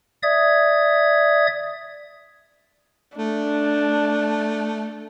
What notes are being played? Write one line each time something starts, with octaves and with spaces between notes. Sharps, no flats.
D5 E5 D#6 G#6
A3 D4